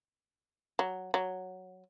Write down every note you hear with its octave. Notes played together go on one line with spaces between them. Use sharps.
F#3
F#3